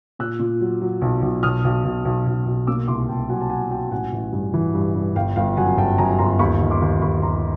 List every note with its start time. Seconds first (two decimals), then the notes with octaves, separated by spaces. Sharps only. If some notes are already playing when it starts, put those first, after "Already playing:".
0.19 A#2 E6 F#6
0.39 A#2
0.61 F#3
0.81 F#3
1.02 B1
1.22 B1
1.43 B1 D#6 F6
1.64 B1
1.84 B1
2.05 B1
2.27 B1
2.46 B1
2.67 A#3 D6 E6
2.88 C2 C6 D6
3.09 C2 G5 A5
3.29 F#3 F#5 G#5
3.41 A5
3.50 F#3 F#5 G#5
3.71 F#3 G5 A5
3.91 A1 F#5 G#5
4.12 A1
4.33 G2
4.54 E3
4.74 G2
4.95 G2
5.15 G1 F5 G5
5.36 G1 F5 G5
5.57 F#2 F#5 G#5
5.77 G1 G5 A5
5.98 F#2 G#5 A#5
6.19 G1 A#5 C6
6.39 D#2 B5 C#6
6.61 D#3
6.71 C6 D6
6.82 D#2
7.01 D#2 B5 C#6
7.22 D#2 A#5 C6